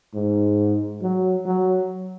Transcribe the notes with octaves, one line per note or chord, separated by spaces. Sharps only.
G#2
F#3
F#3